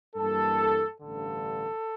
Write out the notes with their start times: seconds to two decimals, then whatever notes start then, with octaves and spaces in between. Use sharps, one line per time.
0.16 G2 E3 G3 A#3 A4
1.01 A1 G2 D3 A4